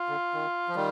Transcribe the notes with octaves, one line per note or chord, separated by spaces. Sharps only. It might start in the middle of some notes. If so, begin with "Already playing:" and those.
Already playing: F4
D3
D#3
F3
D#3 G3